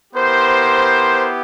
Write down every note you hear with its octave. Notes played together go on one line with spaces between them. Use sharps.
B3 E4 G4 A#4 C5